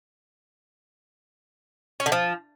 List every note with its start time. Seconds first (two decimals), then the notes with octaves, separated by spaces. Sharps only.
2.00 C#4
2.06 D3
2.12 F3